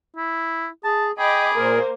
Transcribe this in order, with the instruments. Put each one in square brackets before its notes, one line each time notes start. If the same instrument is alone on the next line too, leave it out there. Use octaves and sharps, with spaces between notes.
[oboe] E4
[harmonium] G#4 [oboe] A5
[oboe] G#4 [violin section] D#5 B5 D6 [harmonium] G5
[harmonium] A#2 A#4 [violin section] A#3 C5